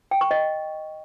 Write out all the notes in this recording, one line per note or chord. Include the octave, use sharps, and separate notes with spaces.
G5
C#6
D#5